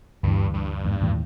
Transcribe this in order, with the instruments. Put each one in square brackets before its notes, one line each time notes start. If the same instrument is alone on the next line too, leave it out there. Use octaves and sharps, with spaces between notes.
[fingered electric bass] D2 E3 [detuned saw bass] G2
[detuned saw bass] G2
[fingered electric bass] E2 G#2
D#2 A2 E3